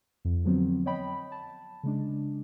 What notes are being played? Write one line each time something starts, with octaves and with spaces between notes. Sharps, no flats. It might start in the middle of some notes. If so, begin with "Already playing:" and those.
F2
D3 F3 F#3 B3 C4
C#5 D#5 G5 B5
A5
C#3 G#3 D4